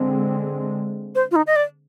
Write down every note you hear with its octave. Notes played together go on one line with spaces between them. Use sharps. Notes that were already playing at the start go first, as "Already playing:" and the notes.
Already playing: D3 G#3 C4
C5
F4
D#4
D#5
D5